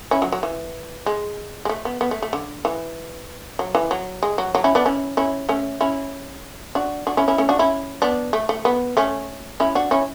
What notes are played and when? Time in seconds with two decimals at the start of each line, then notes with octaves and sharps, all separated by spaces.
0.11 C#4 E4
0.22 F#3
0.32 F#3
0.43 E3
1.06 G#3
1.65 G#3
1.69 A3
1.85 B3
2.01 B3
2.11 A3
2.22 A3
2.33 D3
2.65 E3
3.59 F#3
3.75 E3
3.91 F#3
4.23 G#3
4.38 F#3
4.55 F#3
4.64 C#4 E4
4.75 B3 D4
4.86 C#4 E4
5.17 C#4 E4
5.49 A3 C#4
5.81 C#4 E4
6.75 D4 F#4
7.07 D4 F#4
7.17 C#4 E4
7.28 C#4 E4
7.38 A3 C#4
7.49 D4 F#4
7.59 C#4 E4
8.02 B3 D4
8.33 A3
8.49 A3
8.65 B3
8.97 A3 C#4
9.60 C#4 E4
9.75 D4 F#4
9.91 C#4 E4